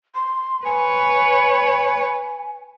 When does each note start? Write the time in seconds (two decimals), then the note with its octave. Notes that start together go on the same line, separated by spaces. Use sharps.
0.15 C6
0.65 B4 C#5 G#5